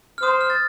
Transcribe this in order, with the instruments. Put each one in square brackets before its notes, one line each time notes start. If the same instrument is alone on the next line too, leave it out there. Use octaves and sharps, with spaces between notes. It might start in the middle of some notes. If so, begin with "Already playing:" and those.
[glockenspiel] F6
[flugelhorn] C5 [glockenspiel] D#6
[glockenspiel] F6
A6